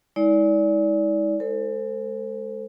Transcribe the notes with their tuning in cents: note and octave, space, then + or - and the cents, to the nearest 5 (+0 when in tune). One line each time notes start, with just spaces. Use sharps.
G#3 +0 E4 -45 D5 -25
G#3 +10 A4 +40 C5 +0